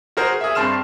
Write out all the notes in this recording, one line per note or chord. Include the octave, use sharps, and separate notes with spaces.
F#4 G#4 A#4 C5
G#4 E5
G2 C4 A5 C6 F6 E7